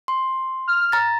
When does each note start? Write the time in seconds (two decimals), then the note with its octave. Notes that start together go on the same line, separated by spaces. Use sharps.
0.08 C6
0.67 F6
0.92 A#5 A6